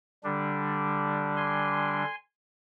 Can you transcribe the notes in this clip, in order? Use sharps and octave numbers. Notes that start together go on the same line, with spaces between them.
D3 G3 D4
G#5 C6